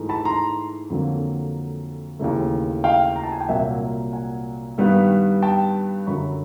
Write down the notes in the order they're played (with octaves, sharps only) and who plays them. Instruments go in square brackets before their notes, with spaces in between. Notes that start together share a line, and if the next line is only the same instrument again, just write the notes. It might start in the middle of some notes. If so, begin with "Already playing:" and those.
Already playing: [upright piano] G#2 E3 A3
A5 B5
A#5 C6
F2 D3 F#3 A#3
D#2 C#3 E3 A3
F5 G5
A#5
A5
G#5
G5
C2 A#2 F#3 A#3 E5 F#5
F#5 G#5
G2 D#3 G3 B3
G5 A5
F#2 D3 F#3 B5 C#6